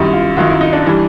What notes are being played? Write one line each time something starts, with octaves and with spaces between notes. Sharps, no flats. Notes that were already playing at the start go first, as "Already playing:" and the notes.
Already playing: F#2 D#3 G3 E4
F4
F#2 D#3 F#3 F4
E4
D#4
D4
E3 G3